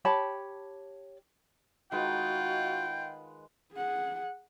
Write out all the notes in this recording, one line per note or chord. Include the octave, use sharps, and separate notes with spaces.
G4 C#5 A5 B5
D#3 G#3 F4 F#4 B4 F#5 G5
G#4 F#5